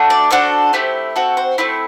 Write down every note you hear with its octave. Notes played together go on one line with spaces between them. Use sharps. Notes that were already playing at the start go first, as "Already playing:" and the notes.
Already playing: A3 D4 F#4
D5
D4 F#4 A4 C5
A3 C4 E4 G4
C4 F#4 A4
C5
A3 C4 E4